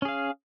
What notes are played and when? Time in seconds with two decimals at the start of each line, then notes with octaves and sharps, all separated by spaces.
0.02 C#4
0.05 G#4
0.08 F5